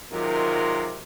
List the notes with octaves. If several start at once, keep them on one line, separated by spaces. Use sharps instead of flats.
C3 D#3 F#3 G#3 F4 A#4